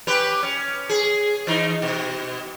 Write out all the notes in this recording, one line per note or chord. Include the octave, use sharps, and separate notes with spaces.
C#4 G4 B4
C#4
G#4
E3 D#4
B2